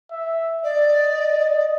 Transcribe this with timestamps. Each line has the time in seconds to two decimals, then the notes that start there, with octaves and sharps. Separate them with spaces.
0.12 E5
0.63 D5 D#5